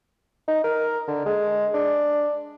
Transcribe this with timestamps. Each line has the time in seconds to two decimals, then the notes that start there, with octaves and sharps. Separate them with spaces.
0.48 D#4
0.64 A#4
1.08 D3
1.26 G#3
1.74 D4